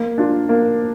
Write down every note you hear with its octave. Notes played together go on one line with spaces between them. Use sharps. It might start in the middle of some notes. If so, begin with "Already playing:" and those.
Already playing: A#3
D4 F4
A#3